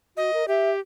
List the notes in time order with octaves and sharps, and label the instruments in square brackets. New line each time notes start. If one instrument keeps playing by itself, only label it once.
[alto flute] F#4 [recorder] D#5
[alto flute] A#4
[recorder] G4 [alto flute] E5